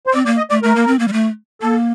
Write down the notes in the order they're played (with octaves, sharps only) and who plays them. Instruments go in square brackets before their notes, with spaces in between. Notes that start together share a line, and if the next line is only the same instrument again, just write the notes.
[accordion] C5
[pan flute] C4 [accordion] D5
[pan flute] A#3 [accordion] D5
[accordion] D#5
[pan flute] A3 [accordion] D5
[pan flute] A3 [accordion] A#4
[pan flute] A#3
C4
A#3
G3
A3
[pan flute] A#3 [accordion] A4